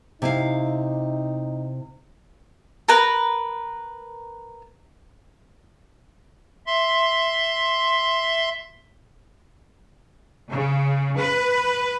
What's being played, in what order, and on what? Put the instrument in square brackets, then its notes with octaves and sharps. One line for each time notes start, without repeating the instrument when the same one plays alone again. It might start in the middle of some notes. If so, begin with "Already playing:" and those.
[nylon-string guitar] C3 E4 F5 [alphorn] D#4
[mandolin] A#4 B4
[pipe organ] E5 C6
[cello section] C#3
B4